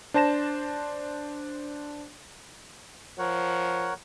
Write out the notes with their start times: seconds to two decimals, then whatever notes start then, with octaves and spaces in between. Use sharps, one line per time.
0.14 D4 C5 A5 A#6 E7
3.18 F3 A#4 C#5 F#5